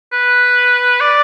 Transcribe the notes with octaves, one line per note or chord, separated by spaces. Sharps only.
B4
D5